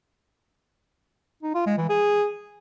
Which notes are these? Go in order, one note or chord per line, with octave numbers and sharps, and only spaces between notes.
D#4
F4
G#3
E3
G#4